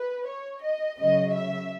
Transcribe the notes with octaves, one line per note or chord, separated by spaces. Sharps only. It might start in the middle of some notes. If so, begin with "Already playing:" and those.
Already playing: B4
C#5
D#5
C#3 F#3 D#5
E5